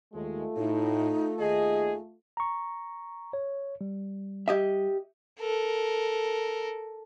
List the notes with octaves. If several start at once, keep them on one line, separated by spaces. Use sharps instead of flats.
D#2 G#3 A3 F4
A2 D#4
D#2 G#4 D#5
A#5 C#6
C#5
G3
G4 D#5 E5
A4 A#4